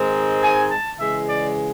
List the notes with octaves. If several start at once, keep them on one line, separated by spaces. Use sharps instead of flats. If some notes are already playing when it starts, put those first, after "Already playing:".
Already playing: G#2 D#3 G#3 C4 D#4
G#5
A5
C#3 E3 G#3 E5
D5